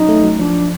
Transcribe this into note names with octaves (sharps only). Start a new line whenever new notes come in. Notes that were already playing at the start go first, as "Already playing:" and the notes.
Already playing: F#3 C#4 D#4
A3
F#3
F3 D4